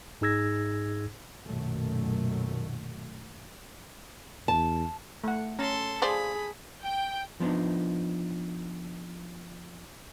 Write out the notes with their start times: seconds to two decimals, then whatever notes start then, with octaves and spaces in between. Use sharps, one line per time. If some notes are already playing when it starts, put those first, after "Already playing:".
0.21 G#2 D#4 G#4 E6 G#6 A#6
1.44 B1 F#2 A#2 D#3 F#3 A3
4.48 E2 A5
5.24 A3 F#5
5.59 C#4 A4 A#5 C6
6.02 F3 G#4 C5 D5 B5
6.83 G5
7.40 F3 B3 D4 D#4